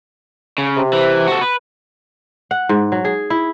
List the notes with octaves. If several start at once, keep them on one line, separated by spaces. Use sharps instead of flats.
C#3
C3
E3
F#4 A4
B4
F#5
G#2
F#3
G#4
E4